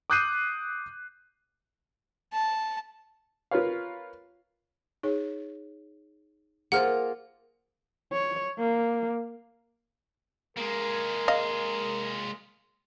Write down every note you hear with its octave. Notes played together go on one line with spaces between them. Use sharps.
D6 D#6 F#6 G6 C7 D#7
A5
F4 A#4 B4 C#5 F5
D#4 G#4 C#5
A#3 F4 G#4 C5 F#5 F6
C#5
A#3
G#3 A#3 A#4
D#5 F5